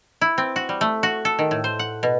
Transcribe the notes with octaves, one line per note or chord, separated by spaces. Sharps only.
E4
C4
F#4
G3
A3
F#4
A4
D#3
A2
C5
F#5
B2